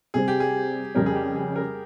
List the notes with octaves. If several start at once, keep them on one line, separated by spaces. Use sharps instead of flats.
C3 G3 C4 G#4
G4
G#4
F2 C#3 G3 C#4 A#4
G#4
G4
G#4
A#4